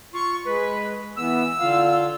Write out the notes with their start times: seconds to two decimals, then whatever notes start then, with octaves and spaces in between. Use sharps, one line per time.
0.14 F4 C#6
0.46 G#3 B4
1.17 E3 B3 E6
1.60 D3 F4 F5